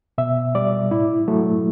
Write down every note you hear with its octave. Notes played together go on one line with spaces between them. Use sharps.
B2 E5
G3 D5
A2 E4
F#3 A3